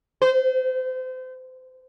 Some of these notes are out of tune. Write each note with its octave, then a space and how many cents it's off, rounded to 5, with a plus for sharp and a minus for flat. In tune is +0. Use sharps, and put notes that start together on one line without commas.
C5 -30